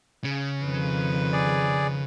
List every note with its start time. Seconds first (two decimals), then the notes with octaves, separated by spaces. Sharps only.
0.24 C#3
0.64 F2 D#3 B4
1.33 G#4 D5